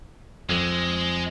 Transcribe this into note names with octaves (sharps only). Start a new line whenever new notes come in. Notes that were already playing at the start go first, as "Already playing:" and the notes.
F2 G#3